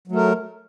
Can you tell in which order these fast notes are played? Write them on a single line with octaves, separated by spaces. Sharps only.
F#3 A3 A#4